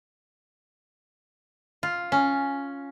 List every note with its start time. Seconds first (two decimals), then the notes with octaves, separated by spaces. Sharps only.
1.83 F4
2.12 C#4